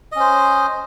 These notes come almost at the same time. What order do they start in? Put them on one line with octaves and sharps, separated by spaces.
D#5 C#4 C5